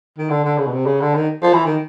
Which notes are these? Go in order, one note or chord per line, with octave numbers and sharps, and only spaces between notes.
D#3
D3
D3
C#3
B2
C3
C#3
D3
D#3
F3
E3
D#3